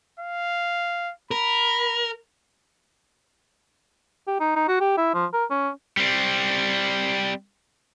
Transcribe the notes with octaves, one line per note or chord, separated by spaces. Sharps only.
F5
A#4 B5
G4
D#4
D#4
F#4
G4
E4
F3
A#4
C#4
G3 C4